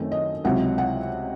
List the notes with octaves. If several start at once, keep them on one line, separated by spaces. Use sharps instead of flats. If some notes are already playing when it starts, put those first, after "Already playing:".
Already playing: F#2 D#3 A3 C4
D#5
C#2 C3 F#3 C4 F#5
F#5